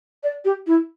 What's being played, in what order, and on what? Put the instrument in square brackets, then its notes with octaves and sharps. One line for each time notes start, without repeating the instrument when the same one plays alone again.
[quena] D5
G4
E4